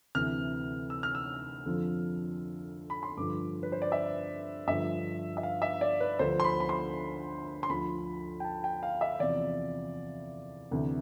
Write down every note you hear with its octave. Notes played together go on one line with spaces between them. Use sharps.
D2 C3 E3 F6
E6
F6
E6
F2 D3 F3
B5
C6
G2 D3 F3 D6
B4
C5
D5
E5
G2 D3 F3 E5
E5
F5
E5
D5
B4
D2 D3 F3 C5
C6
B5
B5
C6
C6
D2 D3 F3 B5
G5
A5
G5
F5
E5
E2 C3 F3 D5
D2 C3 E3